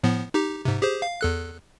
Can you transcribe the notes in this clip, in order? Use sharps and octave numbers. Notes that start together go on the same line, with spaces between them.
A2 F3 B3
D#4 G4
G#2 C3
G4 G#4 C5
F5
E2 A4 F#6